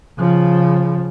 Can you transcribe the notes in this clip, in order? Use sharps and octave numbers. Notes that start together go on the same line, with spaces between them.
C#3 F3